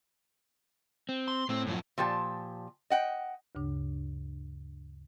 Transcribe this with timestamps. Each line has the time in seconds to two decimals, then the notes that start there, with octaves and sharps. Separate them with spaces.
1.09 C4
1.28 C6
1.49 A2 C4
1.67 F#2 F3
1.98 A#2 F3 G4 C5 A5
2.90 D#5 F#5 G5
3.55 D2 G2 C#3 D4